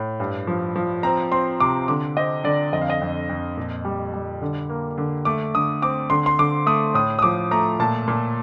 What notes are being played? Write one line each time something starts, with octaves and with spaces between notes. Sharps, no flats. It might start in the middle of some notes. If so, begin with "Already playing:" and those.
Already playing: A2
G2
F3
F3
C4 A#5
C4 C6
C3 D6
D3 D6
C4 D#5
D3 D5
F2 D#5
F5
D#5
F2
F2
A#2
G3
G3
D3
A#3
D3
A3 D6
D3 D#6
C4 D6
D3 C6
C6
D3 D6
A3 D#6
A2 D#6
D#6
F3 D6
A3 A#5
A#2 A5
A#2